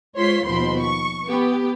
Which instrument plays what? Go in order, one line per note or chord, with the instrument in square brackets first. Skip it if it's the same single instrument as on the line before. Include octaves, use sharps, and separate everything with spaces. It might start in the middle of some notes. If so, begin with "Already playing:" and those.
[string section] G#3 F4 C5 C#5 C6 B6
D#2 B2 F3 C5 B5 C6
C#6
B3 G4